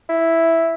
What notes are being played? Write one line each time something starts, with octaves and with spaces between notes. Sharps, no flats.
E4